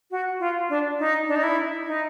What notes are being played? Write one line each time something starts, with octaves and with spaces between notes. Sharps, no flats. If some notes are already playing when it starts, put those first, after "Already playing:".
F#4
F4
D4
D#4
D4
D#4
E4
D#4